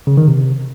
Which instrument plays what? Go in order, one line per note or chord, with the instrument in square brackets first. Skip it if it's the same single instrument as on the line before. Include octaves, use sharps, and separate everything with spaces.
[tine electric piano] C#3
D#3
C3